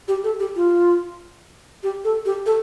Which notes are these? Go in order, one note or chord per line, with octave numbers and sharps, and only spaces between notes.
G4
A4
G4
F4
G4
A4
G4
A4